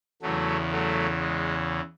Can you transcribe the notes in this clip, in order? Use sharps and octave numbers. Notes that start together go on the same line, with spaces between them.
E2 C#3 E3 F#3 A3
F#3 A3
G#3